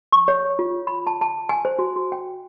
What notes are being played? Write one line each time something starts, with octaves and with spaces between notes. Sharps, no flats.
C#6
C#5
F4
B5
A5
A5
G#5
C5
F#4
F#4
G5